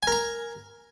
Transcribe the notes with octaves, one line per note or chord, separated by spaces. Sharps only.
A#4 G#5 A#5